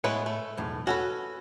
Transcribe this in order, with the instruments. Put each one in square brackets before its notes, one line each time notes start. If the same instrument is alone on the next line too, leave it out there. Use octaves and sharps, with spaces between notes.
[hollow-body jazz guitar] A2 B4 C#5 [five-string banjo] G#3 B3 E4
[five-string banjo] A3
[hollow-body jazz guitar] B1 E2 A2
[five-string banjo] C#4 A4 B4 [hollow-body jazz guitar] F#4